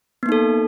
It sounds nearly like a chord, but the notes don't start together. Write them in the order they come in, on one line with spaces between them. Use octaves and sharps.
B3 A#3 D#4 A4